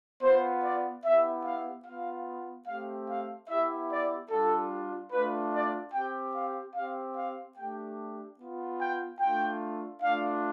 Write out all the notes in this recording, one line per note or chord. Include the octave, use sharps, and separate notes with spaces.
B3 F4 C5
D5
B3 E4 G4 E5
F5
B3 F4 F5
A3 C4 G4 F5
F5
B3 E4 G4 E5
D5
G3 D4 F4 A4
A3 D4 F4 B4
D5
C4 G4 G5
F5
C4 G4 F5
F5
A3 D4 G4 G5
B3 F4
G5
A3 D4 F4 G5
A3 D4 F4 F5